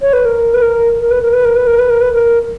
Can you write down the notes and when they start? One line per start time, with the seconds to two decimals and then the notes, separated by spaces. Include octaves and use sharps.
0.02 C#5
0.13 B4
0.25 A#4
0.54 B4
0.62 A#4
1.00 A#4
1.11 B4
1.23 A#4
1.33 B4
1.45 A#4
1.56 B4
1.67 A#4
1.79 B4
1.90 A#4
2.01 B4
2.13 A#4